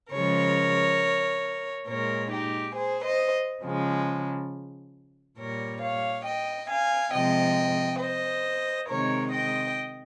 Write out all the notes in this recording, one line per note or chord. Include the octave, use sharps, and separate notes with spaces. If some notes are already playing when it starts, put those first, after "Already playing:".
C#3 F3 G#3 A#4 C#5
A#2 G#3 A#4 C#5
D#4 G4
G#4 C5
C5 D#5
C#3 F3 G#3
A#2 G3 A#4 C#5
C#5 F5
D#5 G5
F5 G#5
C3 F3 G#3 D#5 G5
C5 D#5
C3 D#3 G#3 A#4 C#5
D#5 G5